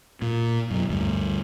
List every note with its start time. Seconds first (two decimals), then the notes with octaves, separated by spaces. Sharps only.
0.22 A#2
0.70 F#2 B2
0.89 D2 G2